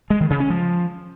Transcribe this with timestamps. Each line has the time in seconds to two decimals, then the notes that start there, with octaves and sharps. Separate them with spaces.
0.10 G#3
0.20 D#3
0.30 C#3
0.40 C#4
0.50 F3